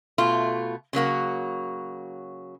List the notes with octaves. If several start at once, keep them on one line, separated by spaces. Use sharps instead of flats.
B2 A3 F4
C#3 F#3 A#3 F#4